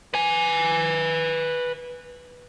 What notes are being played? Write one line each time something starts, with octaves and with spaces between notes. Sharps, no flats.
B4 G#5